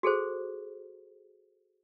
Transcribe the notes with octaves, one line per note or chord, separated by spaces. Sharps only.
F#4 G#4 A4 C5